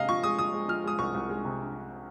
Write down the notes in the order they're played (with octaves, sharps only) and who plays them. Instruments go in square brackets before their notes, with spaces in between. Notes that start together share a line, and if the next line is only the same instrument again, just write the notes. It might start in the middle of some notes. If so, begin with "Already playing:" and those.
Already playing: [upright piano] C3 G#3 [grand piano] D#5 F5
[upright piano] F3 [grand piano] C#6
[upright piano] G#3 [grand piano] D#6
[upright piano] F3 [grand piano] D#6
[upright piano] G#3
[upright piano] F3 [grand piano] F6
[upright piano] G#3 [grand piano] D#6
[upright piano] C2 [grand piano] C#6
[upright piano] C2
G#3
C3